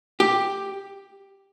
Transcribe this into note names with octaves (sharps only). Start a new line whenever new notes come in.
G4